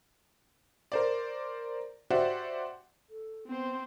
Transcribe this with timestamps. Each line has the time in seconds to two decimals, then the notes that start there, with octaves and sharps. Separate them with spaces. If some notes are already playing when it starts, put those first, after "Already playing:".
0.92 A#4 C5 D5
2.11 F#4 G4 C5 D5 E5 F#5
3.10 A4
3.47 B3 C4 C5